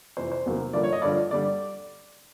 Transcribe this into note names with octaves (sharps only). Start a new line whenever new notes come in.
F2 C3 E3 C5
C5
E2 C3 D#3 F#3 A#3
G2 D3 F3 A#3 D5
C#5
D#5
G2 D3 F3 D5
D3 G3 D5